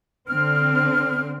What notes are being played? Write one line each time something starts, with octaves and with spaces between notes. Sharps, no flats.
D3 C4 F6